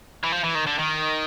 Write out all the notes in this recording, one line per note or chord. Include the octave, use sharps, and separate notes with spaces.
E3
F3
E3
D#3
D3
D#3